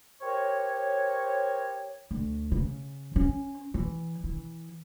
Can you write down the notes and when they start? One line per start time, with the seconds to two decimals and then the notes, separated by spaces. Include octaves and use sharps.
0.22 G4 A#4 C5 C#5
2.11 D2
2.52 C#3
3.16 C#4
3.74 E3
4.24 E3